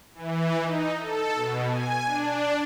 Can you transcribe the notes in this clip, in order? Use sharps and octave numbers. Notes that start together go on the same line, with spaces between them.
E3
D#4
A4
B2
G#5
D4